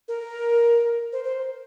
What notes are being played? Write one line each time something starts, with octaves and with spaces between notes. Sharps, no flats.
A#4
C5
C5